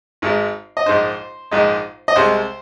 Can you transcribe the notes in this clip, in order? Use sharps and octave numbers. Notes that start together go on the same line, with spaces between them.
G#1 G#2 G#3
D#5
A#1 G#2 G#3 D#4 C5
A#1 G#2 G#3 D#4
D#5
C2 C3 G#3 C5